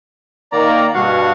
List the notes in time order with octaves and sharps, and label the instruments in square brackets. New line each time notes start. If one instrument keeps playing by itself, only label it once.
[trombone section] D#3 A#3 [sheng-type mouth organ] D5 A#5
[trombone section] G2 B2 [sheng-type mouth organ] F#4 F5 F#5